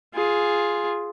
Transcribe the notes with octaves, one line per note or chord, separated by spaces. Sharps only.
F4 G#4